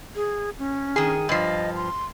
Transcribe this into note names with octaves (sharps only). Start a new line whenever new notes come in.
G#4
C#4
D#3 G#4
G2 F3 D#5
C6